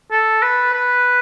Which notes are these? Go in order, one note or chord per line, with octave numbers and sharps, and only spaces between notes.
A4
B4
B4